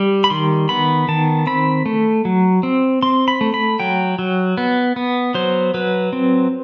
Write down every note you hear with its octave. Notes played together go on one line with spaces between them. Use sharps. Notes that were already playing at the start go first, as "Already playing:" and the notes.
Already playing: G3
B5
D#3 C6
B3 B5
D#3 A5
C4 B5
A3
F#3
C4
C4 C6
B5
A3
B5
F#3 G5
F#3
B3
B3
F#3 C5
F#3 B4
C4